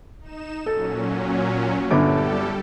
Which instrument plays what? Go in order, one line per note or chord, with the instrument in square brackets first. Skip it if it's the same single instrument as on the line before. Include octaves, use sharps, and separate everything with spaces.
[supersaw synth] D#4 E7
[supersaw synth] A#2 F#3 C#4 [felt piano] A4
[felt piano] G1 D3 D6 [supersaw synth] G3 G4 A4